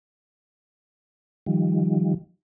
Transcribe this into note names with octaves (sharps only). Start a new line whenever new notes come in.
D#3 F3 G3